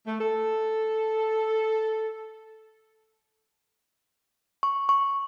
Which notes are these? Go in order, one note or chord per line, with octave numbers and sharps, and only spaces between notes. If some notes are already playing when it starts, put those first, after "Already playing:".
A3
A4
C#6
C#6